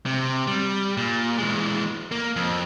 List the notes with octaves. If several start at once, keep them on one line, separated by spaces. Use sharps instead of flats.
C3
G3
A#2
E3 G#3
A#3
F2